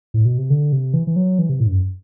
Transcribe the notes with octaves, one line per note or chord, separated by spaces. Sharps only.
A2
B2
C3
D3
C3
E3
E3
F#3
E3
C3
A2
G2
F#2